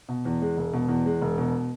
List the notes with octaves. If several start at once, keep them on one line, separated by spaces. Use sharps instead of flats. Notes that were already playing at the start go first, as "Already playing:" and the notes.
B2
E2
G#3
E1
B2
E2
G#3
E1
B2